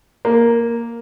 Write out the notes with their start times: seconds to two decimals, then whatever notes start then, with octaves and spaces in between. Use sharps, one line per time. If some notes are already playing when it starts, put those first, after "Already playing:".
0.25 A#3